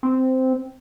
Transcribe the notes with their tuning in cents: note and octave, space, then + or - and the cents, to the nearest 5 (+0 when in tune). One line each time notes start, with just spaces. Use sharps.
C4 -10